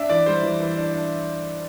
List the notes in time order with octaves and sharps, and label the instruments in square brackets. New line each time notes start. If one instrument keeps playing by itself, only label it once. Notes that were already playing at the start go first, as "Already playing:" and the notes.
Already playing: [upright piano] D4 E5
E3 D5
G3 C5
E3
E3
D4
D4